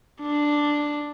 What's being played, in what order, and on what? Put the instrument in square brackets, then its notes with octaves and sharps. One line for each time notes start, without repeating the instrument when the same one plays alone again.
[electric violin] D4